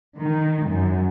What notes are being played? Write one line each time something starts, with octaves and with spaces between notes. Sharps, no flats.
D#3
F#2